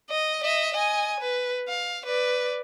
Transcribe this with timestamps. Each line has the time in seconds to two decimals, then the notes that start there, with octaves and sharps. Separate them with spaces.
0.10 D#5
0.44 D#5 E5
0.74 D#5 G#5
1.20 B4
1.68 F5
2.06 B4 D5